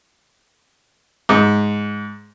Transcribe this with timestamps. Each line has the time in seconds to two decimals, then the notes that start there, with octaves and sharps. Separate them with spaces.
1.29 G#2